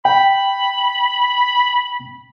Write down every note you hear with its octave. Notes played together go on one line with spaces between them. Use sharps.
G5 B5